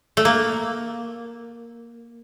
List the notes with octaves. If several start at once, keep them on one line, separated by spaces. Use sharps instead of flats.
A3
A#3